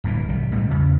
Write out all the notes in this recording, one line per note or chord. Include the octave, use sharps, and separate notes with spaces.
D1 G2 A#2 E3
B1 D#3 F#3 G3
A2 G3 G#3
E2 C#3